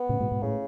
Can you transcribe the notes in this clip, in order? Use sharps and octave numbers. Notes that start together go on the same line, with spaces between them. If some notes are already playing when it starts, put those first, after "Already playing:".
Already playing: B3
A2 C#3
G#2 B2
G#2 B2
A2 C#3